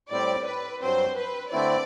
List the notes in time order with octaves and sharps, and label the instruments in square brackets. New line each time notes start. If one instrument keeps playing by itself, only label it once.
[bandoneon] A2 G3 C4 G4 [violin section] D5
[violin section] B4
[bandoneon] G2 F#3 C4 [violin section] C5
[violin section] B4
[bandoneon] D3 A3 C4 E4 [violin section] D5